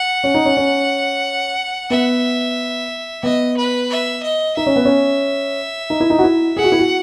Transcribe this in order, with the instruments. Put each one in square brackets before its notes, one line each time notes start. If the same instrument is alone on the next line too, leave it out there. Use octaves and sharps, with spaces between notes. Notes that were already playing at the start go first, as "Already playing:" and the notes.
Already playing: [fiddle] F#5
[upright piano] C#4
D#4
C#4
C#4
[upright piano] B3 [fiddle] E5
[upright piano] B3 [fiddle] D#5
[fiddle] B4
E5
D#5
[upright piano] D#4 [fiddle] E5
[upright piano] C#4
B3
C#4
D#4
E4
D#4
F#4
E4
[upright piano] G#4 [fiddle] F#5
[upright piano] F#4
E4
F#4